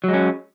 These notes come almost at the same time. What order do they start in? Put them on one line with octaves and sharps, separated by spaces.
F#3 G#3 C#4